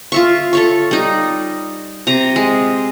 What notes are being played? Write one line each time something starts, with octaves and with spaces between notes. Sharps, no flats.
F4 E5 C#6
A4 C#5 C#6
G3 D#4
C3 A#5
G#3